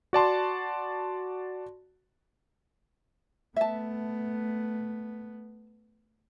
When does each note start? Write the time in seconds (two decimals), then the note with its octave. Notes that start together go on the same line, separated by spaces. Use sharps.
0.13 F#4 D5 A5 C6
3.56 A3 B3 E5 A5